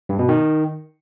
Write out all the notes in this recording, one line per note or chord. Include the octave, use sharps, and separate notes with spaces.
G2
B2
D#3